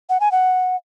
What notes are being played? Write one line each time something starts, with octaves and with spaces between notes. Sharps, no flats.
F#5
G#5
F#5